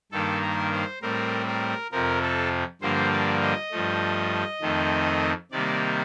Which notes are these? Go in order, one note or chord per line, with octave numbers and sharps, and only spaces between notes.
G2 D#3 A#3 A4
A#4
C5
A2 G3 C4 A#4
A#4
F2 C3 F3 A#4
A4
G2 D3 F3 A#3 C5
D5
D#5
G2 F3 A3
F2 D#3 A3 C4
C3 D#3 G3 A#3 D5